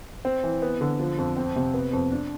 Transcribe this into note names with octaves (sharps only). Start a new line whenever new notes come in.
C4
E3
B3
D3
F3
F2
C4
C3
B3
F2
D4